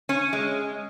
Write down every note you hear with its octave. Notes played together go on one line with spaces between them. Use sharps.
C#4
G#3